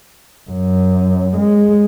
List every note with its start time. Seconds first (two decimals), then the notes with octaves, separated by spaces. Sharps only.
0.50 F#2
1.37 G#3